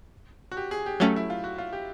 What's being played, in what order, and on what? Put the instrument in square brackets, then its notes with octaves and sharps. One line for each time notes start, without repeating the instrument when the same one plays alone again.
[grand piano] F#4
G4
G#4
G4
[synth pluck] F#3 A3 C#4
[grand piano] E4
F4
F#4
F4
G4